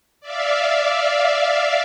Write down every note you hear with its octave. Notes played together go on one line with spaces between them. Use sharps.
D5 E5 F5